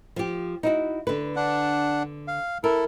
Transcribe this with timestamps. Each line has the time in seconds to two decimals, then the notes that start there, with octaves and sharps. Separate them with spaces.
0.16 F3 G4
0.63 D#4 E4 F#4
1.07 D3 B4
1.36 D4 F#5
2.28 F5
2.64 E4 A4 A#4